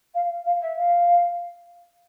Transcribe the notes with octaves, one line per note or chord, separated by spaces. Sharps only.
F5
F5
E5
F5